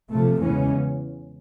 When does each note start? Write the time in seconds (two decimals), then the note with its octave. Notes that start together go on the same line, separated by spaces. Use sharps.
0.11 C3 F3 A3
0.39 E2 C#3 E3 G#3 C#4